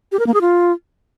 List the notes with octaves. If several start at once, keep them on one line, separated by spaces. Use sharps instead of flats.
G4
A#4
A#3
G#4
F4